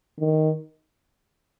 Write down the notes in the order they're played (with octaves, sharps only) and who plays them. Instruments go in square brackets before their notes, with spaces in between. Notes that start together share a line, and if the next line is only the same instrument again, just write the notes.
[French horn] D#3